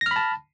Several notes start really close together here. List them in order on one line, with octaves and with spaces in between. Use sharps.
A#6 F6 B5 A5